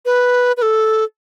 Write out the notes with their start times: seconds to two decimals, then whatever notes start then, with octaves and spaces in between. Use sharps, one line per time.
0.05 B4
0.57 B4
0.62 A4